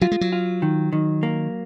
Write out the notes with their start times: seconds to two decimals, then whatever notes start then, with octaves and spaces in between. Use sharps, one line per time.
0.01 F#3 F4
0.11 G#3
0.21 F#3
0.32 F4
0.62 D#3
0.93 D#3
1.23 A#3